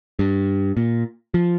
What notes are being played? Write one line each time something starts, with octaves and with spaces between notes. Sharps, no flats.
G2
A#2
F3